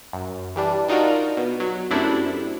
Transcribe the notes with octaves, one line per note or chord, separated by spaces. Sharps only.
F#2
E3 G3 D4
D4 D#4 F4 F#4 A#4
B2
F#3
F#2 C3 A3 D4 E4